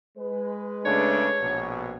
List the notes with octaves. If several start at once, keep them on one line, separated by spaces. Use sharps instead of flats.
G#3 B4
C#3 A3 D4 C#5
A#1 B2